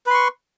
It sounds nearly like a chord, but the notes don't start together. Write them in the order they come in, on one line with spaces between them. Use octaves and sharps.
B4 C6 C#6